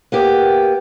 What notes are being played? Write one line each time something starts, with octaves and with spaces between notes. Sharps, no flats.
A#3 B3 G4